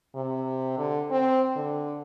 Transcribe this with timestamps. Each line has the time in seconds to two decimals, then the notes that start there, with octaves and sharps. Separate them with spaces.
0.15 C3
0.78 D3
1.11 C4
1.56 D3